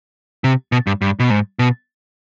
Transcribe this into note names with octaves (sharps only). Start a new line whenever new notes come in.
C3
B2
G2
G2
B2
G#2
B2